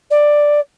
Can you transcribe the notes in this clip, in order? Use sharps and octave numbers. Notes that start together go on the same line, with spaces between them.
D5